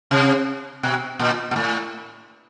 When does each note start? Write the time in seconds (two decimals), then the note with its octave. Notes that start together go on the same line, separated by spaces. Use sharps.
0.11 C3
0.83 B2
1.19 A#2
1.51 A#2
1.56 A2